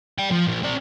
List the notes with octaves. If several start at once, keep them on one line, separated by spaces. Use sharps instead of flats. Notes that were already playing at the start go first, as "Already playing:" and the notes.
D5 G5
F3
A#2 F3
C4 D5